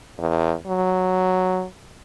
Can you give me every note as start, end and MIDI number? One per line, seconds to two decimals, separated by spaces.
0.18 0.54 40
0.67 1.66 54